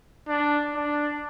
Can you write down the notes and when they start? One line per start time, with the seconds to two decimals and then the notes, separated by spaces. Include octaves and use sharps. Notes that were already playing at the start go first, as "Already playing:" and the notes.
0.28 D4
0.75 D4